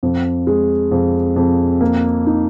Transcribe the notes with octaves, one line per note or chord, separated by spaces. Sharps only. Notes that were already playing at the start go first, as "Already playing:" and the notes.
F2
G#3
F2
F2
A#3
D#4